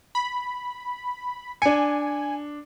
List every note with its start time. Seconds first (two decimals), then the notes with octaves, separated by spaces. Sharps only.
0.15 B5
1.62 D4 G#5 C#7